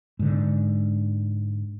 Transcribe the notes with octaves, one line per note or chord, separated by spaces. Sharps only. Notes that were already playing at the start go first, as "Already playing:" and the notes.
G#2 D3